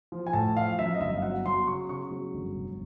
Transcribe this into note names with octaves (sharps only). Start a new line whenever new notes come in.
F3
G#5
A2 A5
F3 F5
F#2 E5
D#5
G1 E5
F5
F#3 F#5
F#3 C6
C#3 C#6
C#3 C#6
F#3
G1
F1